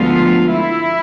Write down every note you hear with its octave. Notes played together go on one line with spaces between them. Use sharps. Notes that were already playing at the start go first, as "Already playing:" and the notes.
Already playing: D2 D3 F3 G#3 B3 F4
E4